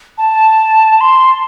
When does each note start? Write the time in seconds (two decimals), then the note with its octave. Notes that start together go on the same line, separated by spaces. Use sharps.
0.18 A5
1.01 C6